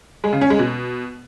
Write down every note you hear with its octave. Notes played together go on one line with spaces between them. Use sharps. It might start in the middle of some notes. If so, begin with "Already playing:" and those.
G#3
C#3
C#4
G#3
B2